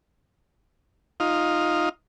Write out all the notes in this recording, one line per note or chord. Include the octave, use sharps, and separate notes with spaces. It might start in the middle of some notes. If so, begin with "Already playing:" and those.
D#4 F4